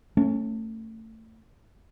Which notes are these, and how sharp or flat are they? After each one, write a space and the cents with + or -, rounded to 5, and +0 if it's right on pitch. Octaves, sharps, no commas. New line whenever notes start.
A3 +25 C#4 -15